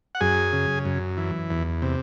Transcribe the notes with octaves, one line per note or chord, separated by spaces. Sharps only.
F#5
F#2 G#4 G#5
C#3
F#2
E3
E2
C3